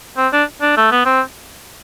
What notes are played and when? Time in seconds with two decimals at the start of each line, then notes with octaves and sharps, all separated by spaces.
0.18 C4
0.33 D4
0.62 D4
0.77 A3
0.92 B3
1.06 C4